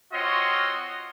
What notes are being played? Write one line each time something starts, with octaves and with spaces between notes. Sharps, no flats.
C4 F4 F#4 C#5 D#5 C6